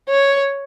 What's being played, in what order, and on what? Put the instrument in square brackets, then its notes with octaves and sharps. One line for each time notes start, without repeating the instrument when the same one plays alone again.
[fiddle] C#5